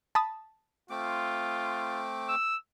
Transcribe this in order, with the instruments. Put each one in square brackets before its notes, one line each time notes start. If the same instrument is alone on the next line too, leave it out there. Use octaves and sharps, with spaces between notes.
[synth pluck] A5 B5 D#6
[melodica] A3 C4 D6 [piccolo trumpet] F4
[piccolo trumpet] E6